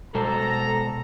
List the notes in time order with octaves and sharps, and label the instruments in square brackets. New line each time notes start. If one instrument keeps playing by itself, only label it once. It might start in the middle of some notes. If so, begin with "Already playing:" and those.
[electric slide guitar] B2 G#3 C5 [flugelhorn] A4 [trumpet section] A#5